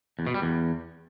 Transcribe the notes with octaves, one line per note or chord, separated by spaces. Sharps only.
E2
B2
G3
E2